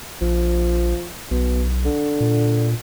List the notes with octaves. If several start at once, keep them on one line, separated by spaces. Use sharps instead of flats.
A#1 F3
B1 B2
D3
A#2